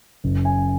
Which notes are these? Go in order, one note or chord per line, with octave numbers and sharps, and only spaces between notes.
F#1
G#5